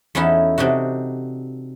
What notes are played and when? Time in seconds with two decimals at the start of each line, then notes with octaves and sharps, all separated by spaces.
0.15 E2 C#4 D#4 E4 F#4 A4
0.58 C3 D4 D#4 F#4